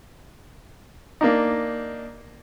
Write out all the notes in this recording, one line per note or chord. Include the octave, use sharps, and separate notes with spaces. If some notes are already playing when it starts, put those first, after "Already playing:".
A#3 D4 D#4